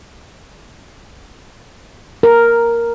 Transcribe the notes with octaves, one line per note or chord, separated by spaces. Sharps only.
A#4